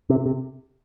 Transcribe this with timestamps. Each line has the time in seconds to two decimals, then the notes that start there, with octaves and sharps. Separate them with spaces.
0.10 C3
0.26 C3